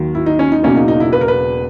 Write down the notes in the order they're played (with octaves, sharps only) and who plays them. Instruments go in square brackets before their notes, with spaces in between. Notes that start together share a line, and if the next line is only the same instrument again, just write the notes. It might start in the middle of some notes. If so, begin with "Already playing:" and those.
Already playing: [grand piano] D#2 D#3 F#3
[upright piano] E4
D#4
C#4
D#4
[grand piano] E1 E2 C#3 F#3 A#3 [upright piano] C#4
[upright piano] D#4
D#4
E4
B4
A#4
B4